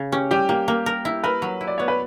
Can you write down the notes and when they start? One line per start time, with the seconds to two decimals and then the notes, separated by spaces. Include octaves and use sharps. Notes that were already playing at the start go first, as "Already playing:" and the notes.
Already playing: C#3
0.12 C#4 G4
0.31 G3 G4
0.49 A#3 G4
0.68 A#3
0.86 A#4
1.05 E4
1.24 A#4 B4
1.42 F#3
1.61 E4
1.67 D5
1.78 B3 C#5
1.88 B4